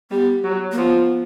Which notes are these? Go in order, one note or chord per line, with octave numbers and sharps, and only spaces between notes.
G3 B3
F#3
A#3
F3 B3